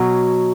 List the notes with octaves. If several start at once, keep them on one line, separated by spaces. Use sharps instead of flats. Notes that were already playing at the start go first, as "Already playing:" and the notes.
Already playing: B2 F#3